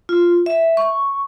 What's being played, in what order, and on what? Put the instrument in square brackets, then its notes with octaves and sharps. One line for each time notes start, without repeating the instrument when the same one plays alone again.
[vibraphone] F4
E5
C#6